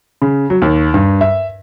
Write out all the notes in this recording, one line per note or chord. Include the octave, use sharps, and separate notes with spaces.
C#3
F#3
D#2
G2
E5